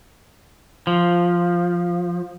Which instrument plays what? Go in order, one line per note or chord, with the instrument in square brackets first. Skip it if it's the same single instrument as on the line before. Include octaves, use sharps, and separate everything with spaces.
[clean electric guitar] F3